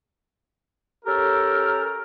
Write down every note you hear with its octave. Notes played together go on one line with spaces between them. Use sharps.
C#4 G4 A4 A#4